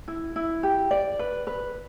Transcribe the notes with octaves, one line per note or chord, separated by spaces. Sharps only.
E4
E4
G4
D5
B4
B4